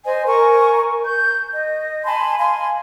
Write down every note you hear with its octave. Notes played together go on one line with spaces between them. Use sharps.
C5 D#5 G#5
A#4 G#5 C#6
G6
D#5
G#5 A5 B5 C6
F5 G#5 C6